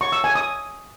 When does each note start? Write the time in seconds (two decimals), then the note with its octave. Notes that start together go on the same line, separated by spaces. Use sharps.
0.01 C#6
0.12 E6
0.24 G#5
0.35 D#6